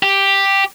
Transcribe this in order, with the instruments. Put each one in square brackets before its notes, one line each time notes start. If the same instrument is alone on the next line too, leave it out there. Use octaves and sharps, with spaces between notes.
[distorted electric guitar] G4